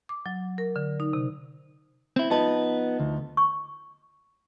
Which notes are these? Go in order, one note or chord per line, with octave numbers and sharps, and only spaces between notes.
D6
F#3
A#4
D3
D#4
C3
C4 E4
F3 B3 D#4 B4 A5
D2
C#6